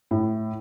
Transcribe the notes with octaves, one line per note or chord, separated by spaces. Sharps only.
A2